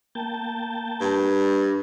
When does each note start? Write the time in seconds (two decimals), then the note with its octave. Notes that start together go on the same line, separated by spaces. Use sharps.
0.15 A#3 G5 A5
1.01 G2